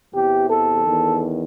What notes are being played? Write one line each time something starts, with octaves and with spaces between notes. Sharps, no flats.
E2 C3 E3 G4
A4
E2 D#3